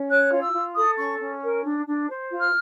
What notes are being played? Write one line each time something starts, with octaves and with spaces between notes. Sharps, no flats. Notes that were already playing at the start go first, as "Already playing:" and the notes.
Already playing: C#4
C#5 F#6
F4
E6
F4
A4 D#6
C#4 C#6
C#4
A#4
D4
D4
C5
F4
F6